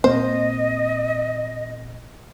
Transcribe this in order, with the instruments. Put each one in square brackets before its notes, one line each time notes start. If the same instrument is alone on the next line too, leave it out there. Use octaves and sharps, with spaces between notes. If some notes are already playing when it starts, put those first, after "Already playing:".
[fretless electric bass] A#2 A#3 C4 [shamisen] C5 [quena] D#5